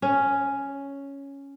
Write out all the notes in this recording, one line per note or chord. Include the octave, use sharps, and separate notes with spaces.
C#4